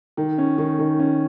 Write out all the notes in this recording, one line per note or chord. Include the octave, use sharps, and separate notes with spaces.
D#3
C#4
D#3
D#3
C#4